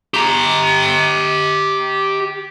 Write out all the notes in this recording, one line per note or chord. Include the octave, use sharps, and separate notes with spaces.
G4 A#5